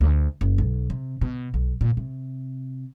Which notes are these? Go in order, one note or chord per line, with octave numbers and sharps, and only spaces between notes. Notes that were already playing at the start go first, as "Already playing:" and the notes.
D2
F#1
B1
C3
B2
B1
A#2
C3